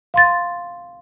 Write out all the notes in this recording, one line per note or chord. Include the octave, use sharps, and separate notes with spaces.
F5 C6 A6